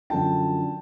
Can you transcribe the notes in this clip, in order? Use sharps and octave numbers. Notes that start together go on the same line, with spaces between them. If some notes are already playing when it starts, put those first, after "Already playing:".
F#2 D3 F3 G5 A5